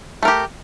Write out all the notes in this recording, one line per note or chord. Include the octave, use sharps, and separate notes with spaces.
A3 G4 A#4